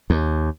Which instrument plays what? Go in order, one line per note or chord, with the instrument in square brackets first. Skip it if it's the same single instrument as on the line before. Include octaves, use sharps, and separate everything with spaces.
[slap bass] D#2